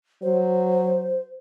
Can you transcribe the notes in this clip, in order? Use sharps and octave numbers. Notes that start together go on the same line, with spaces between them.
F#3 C5